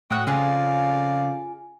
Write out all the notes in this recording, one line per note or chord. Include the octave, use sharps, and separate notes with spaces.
A2 F#4 G5 D#6 F#6
F2 C#3 F4 G#4 D5 F5